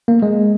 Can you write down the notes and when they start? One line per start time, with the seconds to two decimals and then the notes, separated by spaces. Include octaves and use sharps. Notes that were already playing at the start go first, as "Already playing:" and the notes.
0.08 A#3
0.22 G#3